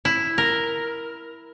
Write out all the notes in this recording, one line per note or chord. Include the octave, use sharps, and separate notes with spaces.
E4
A#4